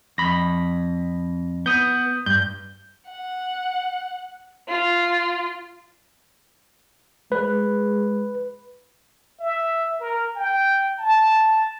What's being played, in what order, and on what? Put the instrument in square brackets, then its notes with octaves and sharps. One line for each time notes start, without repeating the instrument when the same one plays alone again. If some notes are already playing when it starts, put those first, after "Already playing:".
[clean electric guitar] F2 B5 [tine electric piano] A#6
[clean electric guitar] B3 [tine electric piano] D#6 G6
[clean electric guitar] G2 [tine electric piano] G6
[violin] F#5
F4
[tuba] G#3 [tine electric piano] B4
[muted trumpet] E5
A#4
G5
A5